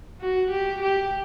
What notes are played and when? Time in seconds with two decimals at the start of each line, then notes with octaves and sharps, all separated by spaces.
0.21 F#4
0.51 G4
0.82 G4